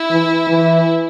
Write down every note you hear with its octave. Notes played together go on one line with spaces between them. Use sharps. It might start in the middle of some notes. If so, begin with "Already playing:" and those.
Already playing: E4
E3
E3